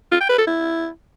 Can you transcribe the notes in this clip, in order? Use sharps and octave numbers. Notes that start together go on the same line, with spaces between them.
F4
G5
B4
A4
E4